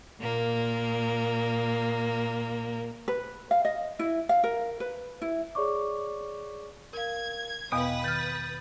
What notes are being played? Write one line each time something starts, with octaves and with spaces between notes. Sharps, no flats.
A#2 A#3
B4
F5
D#5
E4
F5
A#4
B4
E4
G#4 C#5 D5 C#6 D6
A#4 F5 G#6
E2 B2 B3 B4 D#5 F5 G5 D#6
D#3 F6 G6 A6 F#7